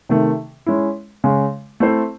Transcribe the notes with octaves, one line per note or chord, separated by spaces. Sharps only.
C3 D#3 A3
G#3 C#4 E4
C#3 G#3 C#4
A3 C4 E4 C5